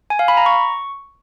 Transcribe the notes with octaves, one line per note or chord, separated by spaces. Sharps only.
G#5
F5
B5
A#5
C#6